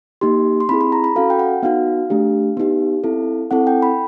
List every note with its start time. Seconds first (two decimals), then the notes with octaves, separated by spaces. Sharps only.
0.21 A#3 D#4 G4 C6
0.60 C6
0.69 C4 E4 G#4 B5
0.81 B5
0.92 A#5
1.04 B5
1.16 C#4 F#4 A4 F5
1.30 G5
1.39 F#5
1.63 B3 D#4 F#4 F5
2.10 A3 D4 G4
2.57 B3 D#4 G4
3.04 C4 E4 A4
3.51 C4 E4 A4 F#5
3.67 G5
3.82 B5